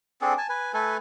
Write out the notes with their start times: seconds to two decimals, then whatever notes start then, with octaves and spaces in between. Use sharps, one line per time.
0.21 C4 D4 G#4 A4
0.38 G#5 A5
0.49 B4 G#5
0.74 A3 A4 B4 G#5